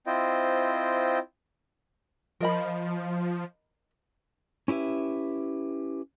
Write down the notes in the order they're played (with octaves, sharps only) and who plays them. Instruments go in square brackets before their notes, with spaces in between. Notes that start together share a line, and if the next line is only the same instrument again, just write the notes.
[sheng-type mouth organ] C4 E4 F4 C5 D#5 G5
[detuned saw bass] F3 [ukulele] A#4 D#5 B5
[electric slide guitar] C#4 E4 G4 B4 E5